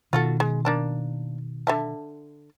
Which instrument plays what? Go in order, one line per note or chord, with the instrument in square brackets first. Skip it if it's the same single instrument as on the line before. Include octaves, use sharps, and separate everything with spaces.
[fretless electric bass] B2 D#3 [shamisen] F4 F#4 A4
[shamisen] G#3
A#3 D4 A5
D3 E5 A5